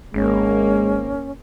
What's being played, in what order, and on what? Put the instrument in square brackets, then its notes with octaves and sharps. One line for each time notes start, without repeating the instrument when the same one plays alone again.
[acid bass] G#1 [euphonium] G#3 [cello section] A#3 [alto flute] C#4